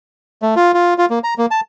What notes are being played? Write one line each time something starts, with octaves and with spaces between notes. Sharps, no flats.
A3
F4
F4
F4
A#3
A#5
A#3
A5